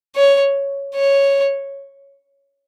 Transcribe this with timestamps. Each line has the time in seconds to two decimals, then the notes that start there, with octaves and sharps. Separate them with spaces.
0.16 C#5
0.95 C#5